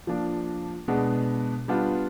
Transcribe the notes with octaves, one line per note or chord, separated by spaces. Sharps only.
F3 A#3 D4
B2 G#3 B3 D4
G3 B3 D4 F4